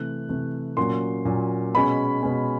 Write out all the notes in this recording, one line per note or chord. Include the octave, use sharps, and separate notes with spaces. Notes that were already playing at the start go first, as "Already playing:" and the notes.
Already playing: C3 E3 A3 F#6
C3 E3 A3
A#2 F#3 A#3 C#4 C6
A#2 F#3 A#3 C#4
B2 G#3 C#4 B5
B2 G#3 C#4